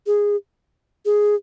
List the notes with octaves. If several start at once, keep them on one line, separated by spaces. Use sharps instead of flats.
G#4
G#4